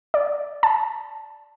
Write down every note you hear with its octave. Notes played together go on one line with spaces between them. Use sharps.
D5
A5